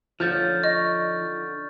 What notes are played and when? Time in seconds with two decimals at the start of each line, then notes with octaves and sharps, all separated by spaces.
0.20 D3 F3 C#4 D#4 F6 G6 A6
0.64 D#5 C#6